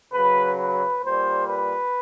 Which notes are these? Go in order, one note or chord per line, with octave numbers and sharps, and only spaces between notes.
C#3 F#3 B4
B4
A#2 G3 C5
B4